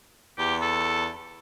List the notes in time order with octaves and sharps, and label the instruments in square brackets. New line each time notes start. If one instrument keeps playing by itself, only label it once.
[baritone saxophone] E2 [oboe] G4
[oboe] A4